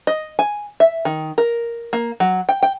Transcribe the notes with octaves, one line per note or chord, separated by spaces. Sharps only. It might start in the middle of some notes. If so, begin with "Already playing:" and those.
D#5
G#5
E5
D#3
A#4
A#3
F#3
G5
G5